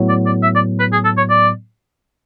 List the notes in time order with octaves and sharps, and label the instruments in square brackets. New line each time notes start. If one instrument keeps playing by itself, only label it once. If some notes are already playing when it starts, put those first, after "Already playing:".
Already playing: [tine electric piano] A2 F#3 B3
[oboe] D5
D5
E5
D5
B4
G#4
A4
C#5
D5